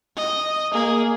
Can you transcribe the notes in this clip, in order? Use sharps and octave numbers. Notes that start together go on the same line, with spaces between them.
D#5
A#3 G#4